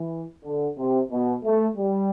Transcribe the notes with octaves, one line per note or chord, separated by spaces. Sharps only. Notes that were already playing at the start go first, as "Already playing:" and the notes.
Already playing: E3
D3
C3
B2
A3
G3